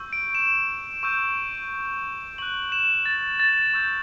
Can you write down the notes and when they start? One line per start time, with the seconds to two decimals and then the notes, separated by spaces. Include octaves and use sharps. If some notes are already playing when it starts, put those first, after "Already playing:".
Already playing: C#6 E6 G6
0.13 D7
0.35 E7
1.03 C#6 E6 G6
2.38 C#6 F#6 F#7
2.72 E7
3.06 A6
3.40 A6
3.73 C#6 E6 G6